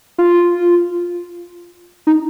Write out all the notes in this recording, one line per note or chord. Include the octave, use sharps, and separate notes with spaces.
F4
D#4